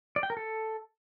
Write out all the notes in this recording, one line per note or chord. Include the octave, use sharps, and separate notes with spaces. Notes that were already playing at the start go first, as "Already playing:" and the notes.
D5
G5
A#4
A4